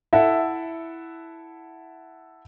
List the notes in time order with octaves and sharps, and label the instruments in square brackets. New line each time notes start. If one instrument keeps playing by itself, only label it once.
[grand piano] E4 A4 E5 F#5